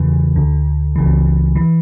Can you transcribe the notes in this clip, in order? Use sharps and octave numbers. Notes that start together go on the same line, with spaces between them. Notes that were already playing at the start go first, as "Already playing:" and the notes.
Already playing: E2 C#3 E3
D2 D3
C#2 C#3 E3
E3